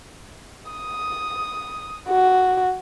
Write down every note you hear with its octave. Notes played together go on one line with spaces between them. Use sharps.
D#6
F#4